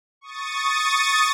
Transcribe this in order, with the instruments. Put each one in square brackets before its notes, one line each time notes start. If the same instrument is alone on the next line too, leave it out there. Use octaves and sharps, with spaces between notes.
[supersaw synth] C#6 D#6 A6